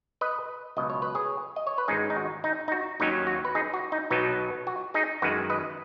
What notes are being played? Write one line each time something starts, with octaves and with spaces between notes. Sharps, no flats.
B4 D#5
C#2 B2 F#3 D#5
C#5
B4
G#4 C#5
D#5
C#5
B4
G#1 G#2 G#3 C#4 D#4 G#4
D#4
F#4
D#4
D#4
F#4
D#2 D#3 F#3 C#4 D#4
F#4
B4
D#4 G#4
F#4
D#4
B1 B2 F#3 B3 D#4
F#4
D#4 G#4
F#2 D#3 G#3 F#4 B4
B4 D#5